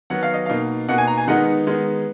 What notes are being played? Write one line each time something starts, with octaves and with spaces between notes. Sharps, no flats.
D#3 F#3 B3 F#5
F5
D#5
B2 A#3 D#4 F5
B2 A#3 D#4 F#5
G#5
A#5
G#5
D#3 G#3 B3 D#4 F#5
D#3 G#3 B3 D#4